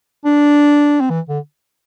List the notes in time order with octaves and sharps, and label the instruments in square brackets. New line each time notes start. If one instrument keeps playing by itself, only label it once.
[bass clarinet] D4
C4
E3
D3